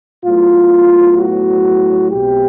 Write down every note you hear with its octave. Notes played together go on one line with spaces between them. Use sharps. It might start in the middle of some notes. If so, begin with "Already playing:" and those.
A2 F#3 B3 F4
F#4
B1 B2 G#3 C4 G4